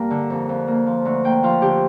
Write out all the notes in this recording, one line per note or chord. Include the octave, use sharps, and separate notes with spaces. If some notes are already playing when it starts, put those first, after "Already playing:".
Already playing: G2 A#3 A#4
D3
F2
F2
A#3
F3
D2
A#3 G5
F3 F4
D3 G4